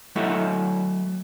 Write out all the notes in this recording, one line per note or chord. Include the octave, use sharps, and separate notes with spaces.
F#3 A3 E4 A4 E5 F#5